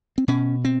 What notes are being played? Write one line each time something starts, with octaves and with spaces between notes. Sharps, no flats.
C4
B2 C#4
C4